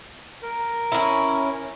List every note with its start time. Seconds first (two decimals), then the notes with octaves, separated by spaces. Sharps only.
0.43 A#4
0.92 C#4 E4